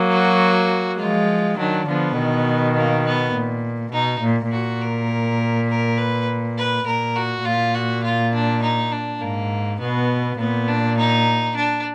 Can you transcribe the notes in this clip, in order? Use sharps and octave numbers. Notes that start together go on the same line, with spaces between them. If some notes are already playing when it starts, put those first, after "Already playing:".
Already playing: F#3 A#3
F#4
F3 G#3 F4
D#3 F#3 D4
D3 F3 B3
B2 D#3
A#3
B3
A#2
B2 D#4
A#2
A#2 F#4
A#4
A#4
B4
B4
A#2 A#4
F#4
A#2 F4
F#4
F4
D4
D#4
D4
G#2 A#3
B2 B3
A#2 B3
D4
D#4
D4